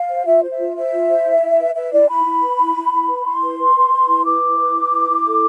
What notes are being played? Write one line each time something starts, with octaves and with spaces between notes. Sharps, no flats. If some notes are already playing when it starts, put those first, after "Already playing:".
Already playing: F5
C5
F4 E5
C5
E5
F4
C5 E5
F4
C5
E4
E4
B4
B4 E5
E4 D5
E4 B5
E4
B4
E4
E4
E4
B4
E4 C6
B4
B4
B4
B4
E4
B4 D6
E4
B4
B4
E4
E4
A4